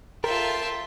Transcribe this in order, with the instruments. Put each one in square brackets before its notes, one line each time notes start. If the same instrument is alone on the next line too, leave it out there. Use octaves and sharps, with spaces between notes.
[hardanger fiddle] F4 E5 [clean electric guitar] A4 A#4 [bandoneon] G5 A5 C6